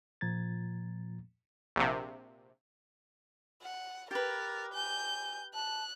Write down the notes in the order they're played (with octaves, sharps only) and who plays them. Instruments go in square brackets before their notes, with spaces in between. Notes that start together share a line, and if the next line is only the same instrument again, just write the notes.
[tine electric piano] A#2 F3 A#5 G#6 A6
[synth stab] A#1 C3
[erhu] F#5
[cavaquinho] G4 B4 [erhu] A#4 [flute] A6
[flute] G#5 [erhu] G6
[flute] A5 [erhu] F#6